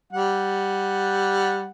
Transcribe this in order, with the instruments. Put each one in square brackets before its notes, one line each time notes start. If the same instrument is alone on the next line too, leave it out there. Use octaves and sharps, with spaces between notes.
[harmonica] G3 F#5